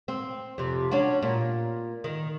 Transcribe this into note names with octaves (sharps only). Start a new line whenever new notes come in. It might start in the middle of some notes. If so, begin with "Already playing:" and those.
C4
F2 C3
C#4 D4 F#4
A#2
D#3